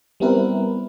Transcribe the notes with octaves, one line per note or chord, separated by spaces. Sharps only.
G3 B3 C4 E4 A#4 B4